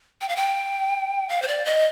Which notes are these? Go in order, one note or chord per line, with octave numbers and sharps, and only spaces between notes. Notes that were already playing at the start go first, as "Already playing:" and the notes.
G5
F5
G5
F5
C5
D5
D#5